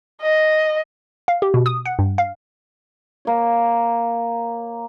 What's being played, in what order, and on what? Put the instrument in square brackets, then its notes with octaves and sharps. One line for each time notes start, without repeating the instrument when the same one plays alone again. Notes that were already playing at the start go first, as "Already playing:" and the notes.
[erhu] D#5
[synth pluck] F5
G4
B2
D#6
F#5
G2
F5
[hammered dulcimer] A#3 C#5